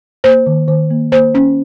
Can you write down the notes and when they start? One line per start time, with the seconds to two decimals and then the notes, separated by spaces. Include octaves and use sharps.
0.24 A#3 C5
0.47 D#3
0.68 D#3 C5
0.91 A#3
1.12 A#3 C5
1.35 C#4